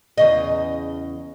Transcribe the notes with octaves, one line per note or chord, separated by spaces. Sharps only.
E2 C#3 D#5